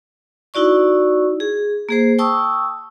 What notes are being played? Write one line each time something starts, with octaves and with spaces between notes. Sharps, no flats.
D#4 E4 F#4 D5 C#6
G#4
A#3 G#4 C5
G5 A5 C#6 D#6 E6